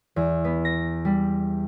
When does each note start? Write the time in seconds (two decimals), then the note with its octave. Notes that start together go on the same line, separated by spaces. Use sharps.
0.16 E2
0.45 B3
0.65 A#6
1.05 G3